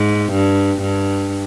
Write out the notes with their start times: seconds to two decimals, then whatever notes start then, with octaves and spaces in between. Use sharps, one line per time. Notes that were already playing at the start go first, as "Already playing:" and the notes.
Already playing: G#2
0.32 G2
0.82 G2